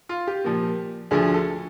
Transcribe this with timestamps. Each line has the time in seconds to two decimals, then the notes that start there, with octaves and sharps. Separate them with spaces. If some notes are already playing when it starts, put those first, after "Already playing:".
0.09 F4
0.27 G4
0.44 A#2 F3 A#3
1.11 D2 D3 F3 G#4
1.34 A4